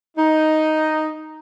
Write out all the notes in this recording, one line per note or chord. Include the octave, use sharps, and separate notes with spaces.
D#4